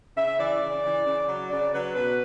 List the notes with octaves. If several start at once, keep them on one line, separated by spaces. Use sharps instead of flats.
C#3 E5
E3 D5
C#3
E3
C#3
F#3
C#3 D5
F#3 B4
B2 B4